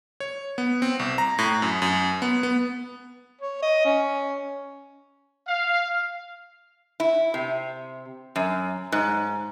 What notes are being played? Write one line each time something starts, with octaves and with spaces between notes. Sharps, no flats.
C#5
B3
C4
C2
A#5
A2
F#2
F#2
B3
B3
C#5
D#5
C#4
F5
E4
C3
F#2
G#2